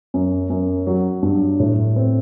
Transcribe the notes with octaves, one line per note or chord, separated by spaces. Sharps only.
F#2
F#2
F#3
G2
A2
C4